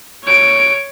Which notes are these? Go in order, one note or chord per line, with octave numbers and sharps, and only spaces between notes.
C#5 D7